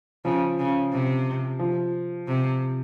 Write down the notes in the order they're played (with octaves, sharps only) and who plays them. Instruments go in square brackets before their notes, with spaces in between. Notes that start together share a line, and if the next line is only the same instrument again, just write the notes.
[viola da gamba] C#3 [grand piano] F3
[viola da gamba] C#3
C3
[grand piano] F3
[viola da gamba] C3